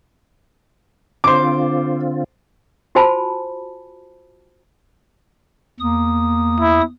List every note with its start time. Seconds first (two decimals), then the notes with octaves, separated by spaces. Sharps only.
1.24 D3 C4 F4 C5 D6
2.95 F4 F#4 C5 G#5 A5 B5
5.80 E2 A#3 D#6
6.60 E4